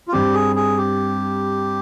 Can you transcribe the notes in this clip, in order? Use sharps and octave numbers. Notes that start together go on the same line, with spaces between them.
F4
G2 G3 C4 G4
G#4
G#4
G4